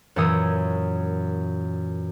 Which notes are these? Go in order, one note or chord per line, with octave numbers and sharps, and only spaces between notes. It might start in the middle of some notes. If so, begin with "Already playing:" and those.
F#2 A#2 E3 C#5 D#6 E6